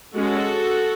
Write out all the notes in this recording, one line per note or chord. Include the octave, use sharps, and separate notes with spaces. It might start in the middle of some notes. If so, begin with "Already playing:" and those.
G#3 C#4 F#4 A4